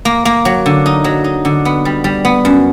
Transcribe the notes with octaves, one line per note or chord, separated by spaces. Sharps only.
A#3
A#3
F#3
D3
D#4
F#3
D#4
D3
B3
G3
G3
B3
F#2